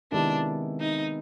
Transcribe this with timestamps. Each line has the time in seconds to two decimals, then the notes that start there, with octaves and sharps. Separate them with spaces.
0.11 C3 D#3 G#3 B3 D4 E4
0.80 D#4